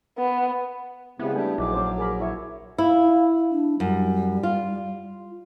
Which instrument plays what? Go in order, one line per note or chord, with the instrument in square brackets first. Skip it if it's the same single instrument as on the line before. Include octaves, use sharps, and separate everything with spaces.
[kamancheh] B3
[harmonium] C#3 G#3 C4 [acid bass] B3 [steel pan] E4 G4
[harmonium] G3 A3 D4 [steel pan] A4 G5 G#5
[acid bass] A#1 [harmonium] F#3 [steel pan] D#4 E4 G#4 [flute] D6
[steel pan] C#4 A4 C5
G#4 A#4 B5
E4 C#5 E5
[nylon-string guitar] E4 [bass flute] F5
[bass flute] D4
[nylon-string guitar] F#2 [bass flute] G3
[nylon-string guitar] F4